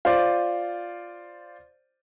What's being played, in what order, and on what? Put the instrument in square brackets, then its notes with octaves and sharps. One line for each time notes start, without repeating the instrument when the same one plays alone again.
[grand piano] F4 C5 D5